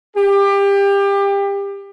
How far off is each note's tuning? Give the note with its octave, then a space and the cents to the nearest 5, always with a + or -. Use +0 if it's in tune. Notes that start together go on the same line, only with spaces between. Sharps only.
G4 +25